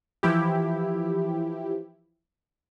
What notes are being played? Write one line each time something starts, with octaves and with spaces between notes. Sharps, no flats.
E3 F3 E4 G4